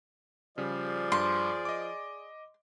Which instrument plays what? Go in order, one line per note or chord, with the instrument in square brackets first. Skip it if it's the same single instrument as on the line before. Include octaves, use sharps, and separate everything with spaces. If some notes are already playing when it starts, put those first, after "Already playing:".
[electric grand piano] C#3 G3 [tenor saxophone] F3 [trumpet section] G#4 D5
[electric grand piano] G2 [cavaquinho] C6
[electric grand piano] D#5 D6